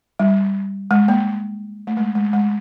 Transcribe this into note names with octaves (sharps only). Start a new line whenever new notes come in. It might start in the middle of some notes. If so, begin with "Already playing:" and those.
G3
G#3
A#3
A3
G#3
G#3
G#3